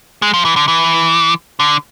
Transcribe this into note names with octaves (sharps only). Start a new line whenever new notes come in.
G#3
F3
E3
D3
E3
D3